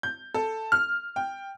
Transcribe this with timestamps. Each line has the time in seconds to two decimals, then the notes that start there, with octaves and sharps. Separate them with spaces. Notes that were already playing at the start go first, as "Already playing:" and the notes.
0.03 G6
0.34 A4
0.72 F6
1.16 G5